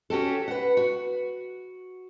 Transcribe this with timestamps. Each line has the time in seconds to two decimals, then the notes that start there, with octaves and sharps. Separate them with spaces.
0.10 C#4 F#4 G4 A4
0.48 B4 F#5
0.77 F#4